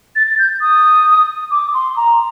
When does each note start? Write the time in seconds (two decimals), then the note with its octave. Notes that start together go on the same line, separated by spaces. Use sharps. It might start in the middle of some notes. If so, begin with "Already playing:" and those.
0.16 A6
0.27 A6
0.39 G6
0.61 D#6
1.51 D6
1.74 C6
1.96 A#5